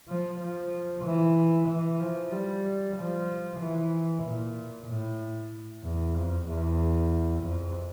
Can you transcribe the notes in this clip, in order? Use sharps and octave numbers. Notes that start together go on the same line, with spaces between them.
F3
F3
E3
E3
F3
G3
F3
E3
A#2
A2
E2
F2
E2
F2